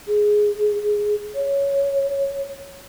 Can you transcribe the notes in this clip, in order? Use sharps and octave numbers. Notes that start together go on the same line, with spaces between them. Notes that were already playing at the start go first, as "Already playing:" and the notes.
G#4
C#5